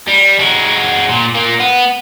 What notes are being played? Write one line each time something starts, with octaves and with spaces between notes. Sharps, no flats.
G3
G#3 F#4
A#2
A#2 A#3
B3